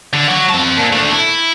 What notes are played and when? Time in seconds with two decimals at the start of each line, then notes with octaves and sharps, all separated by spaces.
0.13 D3
0.29 F#3
0.50 C4 A5
0.78 A#2
0.93 A3 D4
1.12 E4